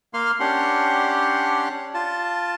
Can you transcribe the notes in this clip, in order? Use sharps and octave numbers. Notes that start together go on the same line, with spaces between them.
A#3 F5 C6 F6
C#4 D4 G4 F#5 C6
F4 A5